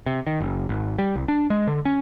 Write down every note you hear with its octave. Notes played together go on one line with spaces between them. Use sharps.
C3
D#3
F#1
G#1
G3
C2
D4
G#3
D3
C#4